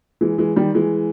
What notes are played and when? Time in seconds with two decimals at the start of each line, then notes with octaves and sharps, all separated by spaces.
0.21 E3 G#3
0.38 E3 G#3
0.56 D#3 G3
0.74 E3 G#3